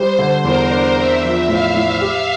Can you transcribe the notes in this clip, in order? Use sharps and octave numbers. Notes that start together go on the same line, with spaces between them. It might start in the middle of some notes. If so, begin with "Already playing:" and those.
Already playing: G3 C5
D3
E2 A#4
D4
C4 E5
F3
A2 F5
A2
G4